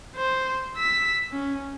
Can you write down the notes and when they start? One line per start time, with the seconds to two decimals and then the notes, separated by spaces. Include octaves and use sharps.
0.16 C5
0.76 E6 B6
1.32 C#4